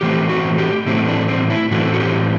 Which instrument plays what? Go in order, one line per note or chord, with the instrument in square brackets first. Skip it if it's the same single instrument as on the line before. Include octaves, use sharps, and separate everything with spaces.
[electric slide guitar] A2 E3 A3 C4 G4
F#4
G4
A2 E3 A3 C4 E4
D4
C4
E4
A2 E3 A3 C4 F#4
F#4
G4